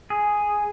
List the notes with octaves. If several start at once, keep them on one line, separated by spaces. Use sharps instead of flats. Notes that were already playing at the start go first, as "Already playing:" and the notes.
G#4